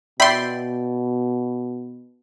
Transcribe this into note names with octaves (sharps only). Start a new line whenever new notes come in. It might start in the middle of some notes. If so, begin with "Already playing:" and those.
B2 D5 E5 G5 B5 C6